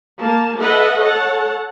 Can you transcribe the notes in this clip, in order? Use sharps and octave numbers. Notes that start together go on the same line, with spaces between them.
A#3 A5
A4 B4 D#5 E5 F#5
A4 C#5 F#5 A5